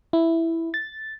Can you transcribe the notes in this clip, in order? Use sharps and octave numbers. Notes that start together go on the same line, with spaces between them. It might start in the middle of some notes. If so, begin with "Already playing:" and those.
E4
A6